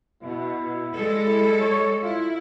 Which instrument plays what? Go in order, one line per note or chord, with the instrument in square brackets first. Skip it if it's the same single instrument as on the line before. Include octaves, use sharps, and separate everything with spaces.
[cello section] B2 [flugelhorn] E4
[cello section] G3 G#3 A4
[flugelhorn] E4
C#5
[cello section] E4 [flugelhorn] F4